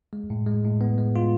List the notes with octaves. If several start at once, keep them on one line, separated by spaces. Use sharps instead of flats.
G#3
A2
G#3
A2
B3
G#3
F4